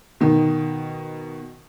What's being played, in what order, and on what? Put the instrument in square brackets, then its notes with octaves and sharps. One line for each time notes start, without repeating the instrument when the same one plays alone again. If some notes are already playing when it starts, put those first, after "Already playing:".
[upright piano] B2 D#3